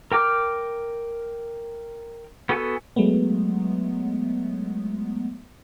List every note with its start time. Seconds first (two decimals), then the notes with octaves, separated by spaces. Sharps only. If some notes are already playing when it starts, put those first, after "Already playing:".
0.12 A#4 G5 D6 F6
2.49 B3 F#4 A4 G#5
2.96 F#3 G#3 A3 B3